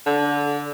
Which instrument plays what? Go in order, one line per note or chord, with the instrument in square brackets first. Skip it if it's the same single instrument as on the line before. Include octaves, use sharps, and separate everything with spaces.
[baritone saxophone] D3